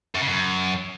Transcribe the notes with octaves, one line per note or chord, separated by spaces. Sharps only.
F#2
C#3
F#2